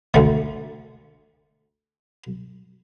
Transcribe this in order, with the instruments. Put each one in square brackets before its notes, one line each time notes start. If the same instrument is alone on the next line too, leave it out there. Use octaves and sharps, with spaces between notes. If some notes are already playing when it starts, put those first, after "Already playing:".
[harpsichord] D2 A3